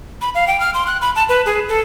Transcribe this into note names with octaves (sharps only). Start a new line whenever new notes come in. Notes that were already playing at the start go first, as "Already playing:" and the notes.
B5
F5
G5
F6
C6
F#6
B5
A5
B4
G#4
A4